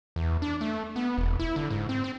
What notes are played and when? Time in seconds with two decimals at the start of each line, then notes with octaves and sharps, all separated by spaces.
0.16 E2
0.42 D4
0.61 A3
0.96 B3
1.18 E1
1.40 E4
1.56 D3
1.71 G#2
1.89 C4
2.04 C4